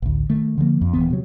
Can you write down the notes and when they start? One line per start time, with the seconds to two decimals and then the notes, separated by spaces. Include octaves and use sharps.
0.02 A1 D2
0.29 D#3 A3
0.58 D3 F3 G3 A#3
0.81 F2
0.93 D#1 A#1 E3 B3
1.10 C3 F#3